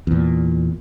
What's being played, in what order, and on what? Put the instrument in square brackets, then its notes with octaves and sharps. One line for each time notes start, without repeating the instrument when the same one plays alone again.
[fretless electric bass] E2 A#2